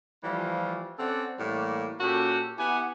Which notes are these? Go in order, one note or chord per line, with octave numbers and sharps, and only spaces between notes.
E3 F3 G3 A3 F4
C4 C#4 A4 D5 F#5
A2 E3 G3 A#3
A#2 C#4 F#4 G4 A4
B3 E4 G4 F#5 G#5